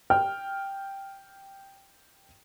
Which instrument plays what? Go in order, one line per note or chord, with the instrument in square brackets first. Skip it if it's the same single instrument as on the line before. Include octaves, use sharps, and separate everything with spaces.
[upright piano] G5 F6